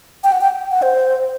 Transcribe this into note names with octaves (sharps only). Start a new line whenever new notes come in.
G5
F#5
G5
F#5
C5